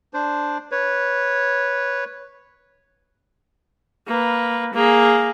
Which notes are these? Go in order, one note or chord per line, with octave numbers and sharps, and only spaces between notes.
D4 C5
B4 C#5
A#3 B4
A#3 G#4